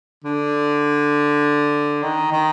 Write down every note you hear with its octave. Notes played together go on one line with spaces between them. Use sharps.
D3
D#3
D#3